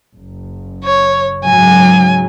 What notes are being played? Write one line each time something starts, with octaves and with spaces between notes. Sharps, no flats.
F#1
C#5
G#2 C#3 F#3 G#5